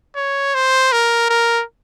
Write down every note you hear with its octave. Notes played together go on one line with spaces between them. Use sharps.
C#5
C5
A#4
A#4